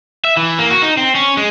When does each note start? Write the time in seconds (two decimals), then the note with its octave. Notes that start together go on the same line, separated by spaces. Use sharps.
0.24 E5
0.37 E3
0.59 A#3
0.70 F#4
0.82 D#4
0.97 C4
1.15 C#4
1.37 G#3